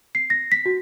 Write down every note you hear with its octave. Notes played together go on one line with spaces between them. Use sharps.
C7
A#6
B6
F#4